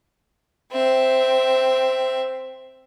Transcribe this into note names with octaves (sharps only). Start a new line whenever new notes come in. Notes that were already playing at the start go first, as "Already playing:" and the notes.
C4 E5